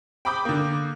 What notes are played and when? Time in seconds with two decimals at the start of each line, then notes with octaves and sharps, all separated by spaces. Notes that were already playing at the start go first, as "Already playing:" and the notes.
0.25 G5 B5 D6 D#6 G6
0.45 D3 A#3